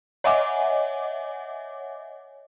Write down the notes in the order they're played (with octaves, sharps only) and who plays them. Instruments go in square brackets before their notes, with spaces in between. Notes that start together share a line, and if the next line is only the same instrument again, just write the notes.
[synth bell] C#5 D#5 E5 F#5 G#5 D6